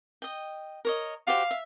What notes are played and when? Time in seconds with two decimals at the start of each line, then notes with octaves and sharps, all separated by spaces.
0.22 D#5 G5
0.85 A#4 C#5 D#5
1.27 F#4 G4 C5 F5
1.51 E5